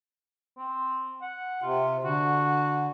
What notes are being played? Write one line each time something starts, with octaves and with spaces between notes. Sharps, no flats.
C4
F#5
C3 F4
D3 F#4